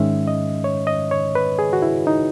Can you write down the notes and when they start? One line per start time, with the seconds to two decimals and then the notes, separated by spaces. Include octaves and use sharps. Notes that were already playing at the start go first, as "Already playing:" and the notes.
Already playing: G#2 D#3 G#3 C#4 E5
0.28 D#5
0.64 C#5
0.87 D#5
1.11 C#5
1.35 B4
1.59 G#4
1.73 F#4
1.82 E4
2.07 D#4